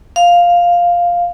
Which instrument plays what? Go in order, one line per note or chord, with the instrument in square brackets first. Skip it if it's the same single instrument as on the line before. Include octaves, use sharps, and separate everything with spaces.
[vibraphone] F5